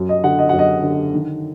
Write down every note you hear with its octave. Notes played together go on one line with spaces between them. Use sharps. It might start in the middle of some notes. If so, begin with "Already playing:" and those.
Already playing: F#2
D#5
D3 F#5
D#5
F#2 F#5
D#5
D3
D#3